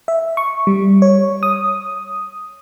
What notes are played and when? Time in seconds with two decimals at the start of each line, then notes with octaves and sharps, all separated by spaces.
0.08 E5
0.37 C#6
0.67 G3
1.02 C#5
1.43 D#6